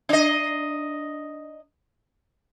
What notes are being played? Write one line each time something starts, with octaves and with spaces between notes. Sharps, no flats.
D4 D#5